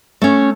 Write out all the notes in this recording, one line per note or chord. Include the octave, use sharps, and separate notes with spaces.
A3 C#4